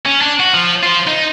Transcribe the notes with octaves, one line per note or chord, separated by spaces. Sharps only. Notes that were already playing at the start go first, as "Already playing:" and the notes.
C#4
D4
F#4
F3
F4 C5
D#4